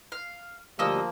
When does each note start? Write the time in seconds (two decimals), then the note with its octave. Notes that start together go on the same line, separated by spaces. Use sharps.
0.12 F5
0.79 D2 F3 G3 A#3 C#4 D#5 E6